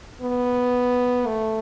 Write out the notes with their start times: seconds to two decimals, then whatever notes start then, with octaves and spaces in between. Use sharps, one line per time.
0.21 B3
1.27 A3